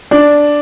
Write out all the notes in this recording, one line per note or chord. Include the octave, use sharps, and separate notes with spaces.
D4